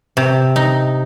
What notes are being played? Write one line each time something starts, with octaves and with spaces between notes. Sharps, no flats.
C3
D#4